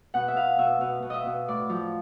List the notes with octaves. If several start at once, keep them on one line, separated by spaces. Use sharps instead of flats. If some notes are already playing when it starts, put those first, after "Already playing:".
B2 F#5
E5
B2 F5
B2 E5
B2 F5
B2
D#5 E5
B2
A2 D5
F3